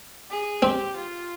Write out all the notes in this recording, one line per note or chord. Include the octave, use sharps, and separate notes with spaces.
G#4
C4 G4
F4